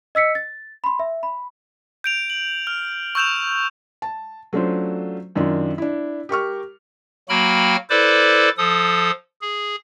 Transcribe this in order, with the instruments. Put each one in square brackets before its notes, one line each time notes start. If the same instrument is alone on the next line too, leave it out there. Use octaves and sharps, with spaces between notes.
[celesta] D#5 E6 B6 C#7
A6
B5 C6
E5
B5
[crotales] G6 D7 F7
F#7
F6
C#6 E6 G6 E7 F7
[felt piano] A5
F#3 A3 C#4 D4 F4 C5
F#2 D#3 D4 F4
D4 E4
G4 A#4 C#6 F6
[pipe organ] F#3 A#3 F#4 G5 B5 F6
E4 A4 B4 C5 D5 D6
F3 A4 D#6
G#4